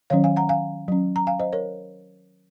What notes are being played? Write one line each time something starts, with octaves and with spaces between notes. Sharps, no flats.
D#3 F#3 C#4 C#5 F5
F5 G#5
F#5 A#5
F5 G#5
F#3 C#4
A#5
F5 G#5
C5 D#5
A#4 C#5